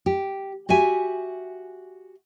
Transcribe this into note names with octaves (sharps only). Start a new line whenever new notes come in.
G4
F#4 G4 E5 G#5